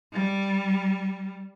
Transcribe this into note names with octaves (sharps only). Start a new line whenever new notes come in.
G3